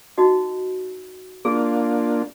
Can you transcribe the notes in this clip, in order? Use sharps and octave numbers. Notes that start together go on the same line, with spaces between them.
D#4 F#4 D#5
A#3 D4 F4 G#4